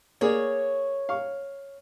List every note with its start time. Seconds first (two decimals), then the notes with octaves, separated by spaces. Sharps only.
0.21 A#3 G#4 C#5 D5
1.09 F5 C#6